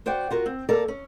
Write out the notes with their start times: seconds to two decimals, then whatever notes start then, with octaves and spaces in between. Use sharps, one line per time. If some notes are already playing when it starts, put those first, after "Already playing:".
0.06 F#4 C5 D5 F#5 G5
0.30 F4 F#4 A#4
0.46 C4
0.69 A#3 A4 A#4 D5
0.88 C#4